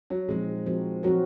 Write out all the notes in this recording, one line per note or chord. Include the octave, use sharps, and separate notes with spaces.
F#3
A#2 F3 G#3 C4 D#4
F3 C4 F#4 A#4
F3 F#3 C4 F#4 A#4